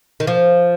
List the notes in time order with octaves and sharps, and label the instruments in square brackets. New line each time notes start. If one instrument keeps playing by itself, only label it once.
[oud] D#3
F3